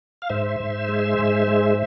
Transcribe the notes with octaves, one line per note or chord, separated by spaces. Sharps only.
F5
G#2 C5 E5
G#2
G#3
G#2
G#3